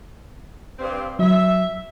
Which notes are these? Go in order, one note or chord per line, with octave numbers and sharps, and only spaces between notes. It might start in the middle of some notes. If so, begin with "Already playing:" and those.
G2 C4
F#3 E5